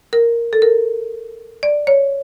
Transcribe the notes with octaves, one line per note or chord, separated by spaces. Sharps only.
A#4
A4
A#4
D5
C#5